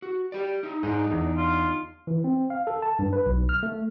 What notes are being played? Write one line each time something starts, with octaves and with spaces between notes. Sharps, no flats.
F#4
G4 D5
D#4 E5
G#2 D4 D#4 D#5
E2
F4
E3
C4
F5
A4
A5
G2
B4
B1
F6
A3